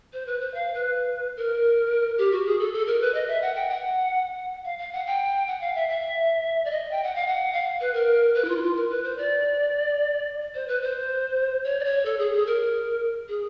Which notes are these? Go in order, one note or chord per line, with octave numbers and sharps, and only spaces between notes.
C5
B4
C5
F5
B4
A#4
G4
F#4
G#4
A4
A4
A#4
B4
D#5
E5
F#5
G5
F#5
F5
F5
F#5
G5
F#5
F5
E5
E5
D5
D#5
G5
F#5
F5
F#5
F5
B4
A#4
B4
E4
F4
E4
F4
A#4
B4
C5
D5
C5
B4
C5
C#5
D5
C#5
A4
G#4
G#4
A#4
G#4